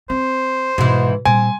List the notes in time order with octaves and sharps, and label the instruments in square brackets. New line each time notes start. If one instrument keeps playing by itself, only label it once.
[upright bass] C4 [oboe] C5
[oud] G#2 E3 [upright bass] B2
[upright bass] A#2 G3 [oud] C4 [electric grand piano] G#5